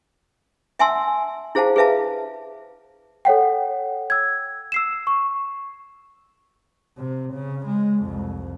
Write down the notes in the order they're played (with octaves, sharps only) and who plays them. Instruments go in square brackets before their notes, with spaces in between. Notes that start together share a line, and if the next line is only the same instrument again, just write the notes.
[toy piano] E5 F#5 G#5 A5 C6 E6
E4 G#4 C5 F5 F#5 A5
G#4 B4 E5 F5 A5
[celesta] A4 C#5 F#5 G5
E6 G#6
E6 C7 E7
C#6
[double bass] C3
C#3
G#3
C2 F2